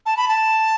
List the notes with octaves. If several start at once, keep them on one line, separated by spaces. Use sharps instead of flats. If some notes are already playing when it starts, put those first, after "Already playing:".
A5
B5
A5